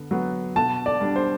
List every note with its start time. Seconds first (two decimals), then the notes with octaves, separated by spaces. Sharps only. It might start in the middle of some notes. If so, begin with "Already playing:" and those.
Already playing: D3 B3
0.11 F#3 B3
0.56 B2 A5
0.86 D5
1.01 G3 D4
1.16 C5